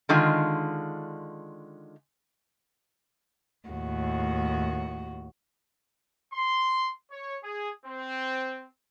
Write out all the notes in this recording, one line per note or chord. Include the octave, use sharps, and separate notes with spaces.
D3 D#3 G#3 F4
D#2 A2 F#4
C6
C#5
G#4
C4